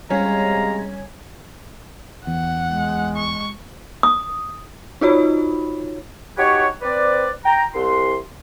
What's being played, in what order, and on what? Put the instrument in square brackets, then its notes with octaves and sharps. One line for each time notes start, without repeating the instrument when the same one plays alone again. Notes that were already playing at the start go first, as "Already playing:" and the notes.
[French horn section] C3 G#3 [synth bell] G3 G#6 [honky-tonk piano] C#4 [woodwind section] F5 A#5
[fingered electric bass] E2 [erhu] F#5
[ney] G#3
[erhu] C#6
[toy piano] D#6
[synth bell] D#4 F4 F#4 C#5 B5
[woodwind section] D#4 F#4 G4 B4 C#5
C4 B4 D5
G5 A#5
C2 C6